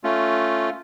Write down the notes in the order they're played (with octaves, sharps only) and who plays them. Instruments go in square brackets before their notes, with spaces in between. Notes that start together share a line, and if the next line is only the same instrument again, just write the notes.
[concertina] A3 C#4 F4